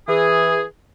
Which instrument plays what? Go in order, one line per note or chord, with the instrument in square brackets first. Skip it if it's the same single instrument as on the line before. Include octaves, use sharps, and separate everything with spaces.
[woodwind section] E3 G#4